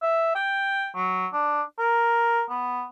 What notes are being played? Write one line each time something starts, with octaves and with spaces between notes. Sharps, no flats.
E5
G5
F#3
D4
A#4
B3